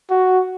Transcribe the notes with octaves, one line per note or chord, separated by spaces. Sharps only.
F#4